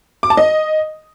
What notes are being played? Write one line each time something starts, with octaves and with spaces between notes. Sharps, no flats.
D6
A5
D#5